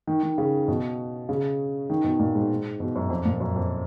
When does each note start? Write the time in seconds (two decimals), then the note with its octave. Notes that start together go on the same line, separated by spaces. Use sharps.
0.07 D#3
0.23 D#3
0.38 C#3
0.68 B2
1.29 C#3
1.90 D#3
2.04 B2
2.19 A#2
2.35 G#2
2.80 B2
2.96 F#2
3.10 F2
3.25 A#2
3.40 F#2
3.56 F2